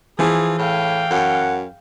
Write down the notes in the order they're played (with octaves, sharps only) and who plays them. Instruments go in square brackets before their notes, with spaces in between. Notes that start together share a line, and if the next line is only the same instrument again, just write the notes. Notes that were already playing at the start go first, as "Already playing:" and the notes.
[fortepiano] E3 [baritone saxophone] F3 [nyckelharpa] G#4
[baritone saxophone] A2 [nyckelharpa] F5 G5
[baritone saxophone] F#2 [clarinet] F#5